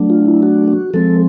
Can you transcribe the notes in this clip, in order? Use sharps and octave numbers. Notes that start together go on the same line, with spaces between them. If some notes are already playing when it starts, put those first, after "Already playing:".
Already playing: F#3 A3 D4
F4
E4
F#4
F#4
F3 G#3 C4 A4